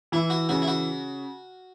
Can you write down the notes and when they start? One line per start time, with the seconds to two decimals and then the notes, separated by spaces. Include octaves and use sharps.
0.12 E3 E4
0.30 F#4
0.49 C#3 F#4
0.62 E4
0.68 F#4